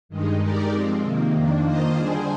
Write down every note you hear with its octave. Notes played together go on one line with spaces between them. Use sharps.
G2 D#3 G#3 D#4
G#3 D#4 G4 A#4 D5
F3 G#3 C4
C3 D#3 A#3
F2 D#3 A#3 D4
D#3 A#3 F4 C5 D#5
D3 G3 D4 G#4 C5